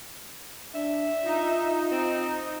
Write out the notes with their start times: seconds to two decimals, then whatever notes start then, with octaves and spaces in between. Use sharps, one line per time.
0.75 D4 E5
1.25 D#4 F4
1.91 C4